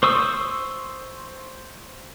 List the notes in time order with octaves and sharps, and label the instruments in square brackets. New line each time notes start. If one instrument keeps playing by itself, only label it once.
[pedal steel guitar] C5 C#6 D#6 E6